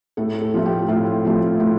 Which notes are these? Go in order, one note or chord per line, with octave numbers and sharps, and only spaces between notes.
A2 A4
A4
F3 A3
G4
A2 F4
F3 A3
A2